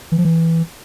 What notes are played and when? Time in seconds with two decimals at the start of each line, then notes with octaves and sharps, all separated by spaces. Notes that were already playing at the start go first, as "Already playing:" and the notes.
0.12 E3
0.18 F3
0.25 E3